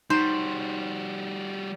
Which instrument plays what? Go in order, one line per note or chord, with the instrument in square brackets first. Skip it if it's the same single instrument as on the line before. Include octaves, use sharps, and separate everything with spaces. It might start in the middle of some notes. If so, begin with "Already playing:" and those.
[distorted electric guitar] G3 F#4 [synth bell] D#4 [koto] C5